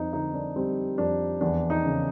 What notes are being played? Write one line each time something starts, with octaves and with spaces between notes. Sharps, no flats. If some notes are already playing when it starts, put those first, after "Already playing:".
Already playing: F2 D#4
D3 D#4
D4
G3 C4
F2 D4
E2 D4
D#4
C#3